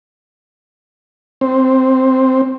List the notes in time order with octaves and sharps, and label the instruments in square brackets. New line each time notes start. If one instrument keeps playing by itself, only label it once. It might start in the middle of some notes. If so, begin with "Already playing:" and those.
[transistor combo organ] C4